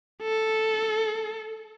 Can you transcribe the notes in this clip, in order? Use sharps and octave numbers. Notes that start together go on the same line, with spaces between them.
A4